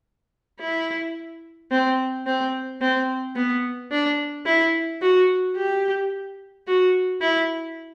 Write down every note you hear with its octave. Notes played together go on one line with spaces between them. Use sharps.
E4
C4
C4
C4
B3
D4
E4
F#4
G4
F#4
E4